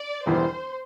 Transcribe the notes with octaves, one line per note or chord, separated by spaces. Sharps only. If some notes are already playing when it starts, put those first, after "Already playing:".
Already playing: D5
E1 E2 E3 G3 C5